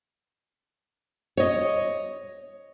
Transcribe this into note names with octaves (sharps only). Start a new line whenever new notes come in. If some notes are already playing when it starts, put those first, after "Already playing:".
C#5 D#5